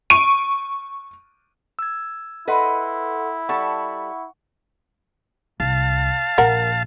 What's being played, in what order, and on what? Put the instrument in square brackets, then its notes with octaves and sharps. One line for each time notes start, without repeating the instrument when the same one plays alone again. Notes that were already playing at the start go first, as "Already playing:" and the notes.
[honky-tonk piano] C#6 D7 D#7
[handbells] E6 G#6
[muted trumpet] E4 [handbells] A4 F#5 C6 [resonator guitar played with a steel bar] B4 D#5
[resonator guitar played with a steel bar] G3 A4 A5 [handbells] F#5 C#6
[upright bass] C2 [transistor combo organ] F5 A5
[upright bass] A#1 [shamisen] A#4 F#5